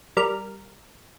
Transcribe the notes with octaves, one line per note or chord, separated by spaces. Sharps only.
G3 A#4 F6